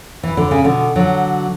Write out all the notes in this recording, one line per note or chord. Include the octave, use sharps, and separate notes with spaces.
E3
D3
C#3
B2 D3
D3 F#3